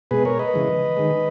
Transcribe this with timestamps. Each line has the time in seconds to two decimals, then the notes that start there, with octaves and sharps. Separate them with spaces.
0.11 B2 G#3 G#4 B4
0.25 A#4 C#5
0.39 B4 D#5
0.53 C#3 E3 G#3
0.97 D#3 G#3